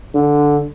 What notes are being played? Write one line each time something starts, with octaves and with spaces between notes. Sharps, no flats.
D3